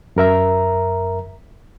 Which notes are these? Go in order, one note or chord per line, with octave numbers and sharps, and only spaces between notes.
F#2 A#4 E5 A#5